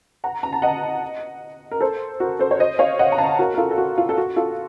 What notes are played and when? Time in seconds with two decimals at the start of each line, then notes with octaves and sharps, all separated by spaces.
0.24 F#5 A#5
0.43 A#5
0.53 A5
0.62 D#5 F#5
1.71 A#4
1.81 A4 C5
2.20 F#4 A#4
2.39 A4 C5
2.51 C#5
2.60 C5 D#5
2.79 C#5 F5
2.99 D#5 F#5
3.12 A#5
3.18 F5 A5
3.39 F#4 A#4
3.54 A#4
3.58 F4 A4
3.71 A4
3.78 F#4
3.98 F4
4.09 A4
4.18 F#4
4.36 F4 A4